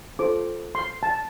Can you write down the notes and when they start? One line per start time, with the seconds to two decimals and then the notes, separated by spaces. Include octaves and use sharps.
0.19 F4 A4 C5 D6
0.75 C6
1.03 A5